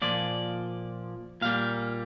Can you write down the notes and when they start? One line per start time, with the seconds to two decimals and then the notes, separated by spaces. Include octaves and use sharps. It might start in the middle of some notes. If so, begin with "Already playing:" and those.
0.02 A#2 F3 A#3 D5
1.41 A#2 G3 A#3 F5